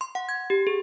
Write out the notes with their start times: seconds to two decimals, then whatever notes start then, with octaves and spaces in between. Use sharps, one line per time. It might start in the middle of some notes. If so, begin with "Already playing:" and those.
0.01 C6
0.15 F#5
0.29 G#6
0.50 G4
0.67 G#4